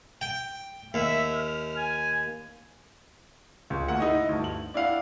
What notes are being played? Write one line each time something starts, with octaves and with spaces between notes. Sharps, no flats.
G5
D#2 E5
F6
G#5
C#2
D2 A#3 F#5
D#4 E4 D#5
D2 G2
F#7
D4 E4 D5 F5 F#5